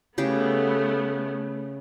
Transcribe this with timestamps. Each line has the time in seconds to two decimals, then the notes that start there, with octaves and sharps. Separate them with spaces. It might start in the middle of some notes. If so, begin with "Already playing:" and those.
0.18 C#3 A3 B3 G4 G#4